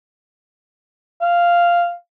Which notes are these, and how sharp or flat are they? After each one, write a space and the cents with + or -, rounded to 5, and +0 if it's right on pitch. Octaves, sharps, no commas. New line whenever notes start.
F5 -5